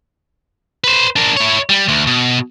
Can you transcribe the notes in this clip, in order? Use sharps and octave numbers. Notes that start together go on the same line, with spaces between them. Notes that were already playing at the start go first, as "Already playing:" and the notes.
B4 C5
D4 A#4
E4 C#5
G3
D2
B2